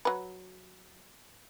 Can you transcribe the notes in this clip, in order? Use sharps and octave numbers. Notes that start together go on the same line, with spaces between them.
F#3 B4